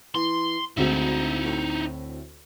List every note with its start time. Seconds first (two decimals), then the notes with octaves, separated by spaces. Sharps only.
0.15 E3 C6
0.77 D2 G#2 C4 D#4 E4 F#4
1.45 A2